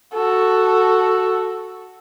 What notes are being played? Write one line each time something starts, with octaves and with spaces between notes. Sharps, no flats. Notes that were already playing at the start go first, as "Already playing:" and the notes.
F#4 A4